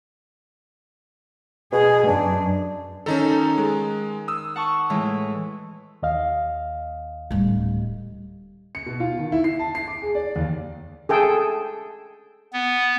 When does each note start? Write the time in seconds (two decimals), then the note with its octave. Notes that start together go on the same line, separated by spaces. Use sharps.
1.72 B2 G#4
2.07 F#2 D4
3.06 D#3 C#4 D#4 A4 A#5
3.58 G#3
4.28 D#6 E6
4.56 F#5 A5 C#6
4.90 A2 E3 G#3
6.03 D#2 D#5 F5
7.31 D1 G3
8.75 C#7
8.86 B2
9.00 F4
9.19 D#3
9.32 E4
9.44 C7
9.59 A5
9.75 C7
9.88 D6
10.02 G#4
10.15 D5
10.36 D#2
11.09 G#4 A4 G5
12.53 B3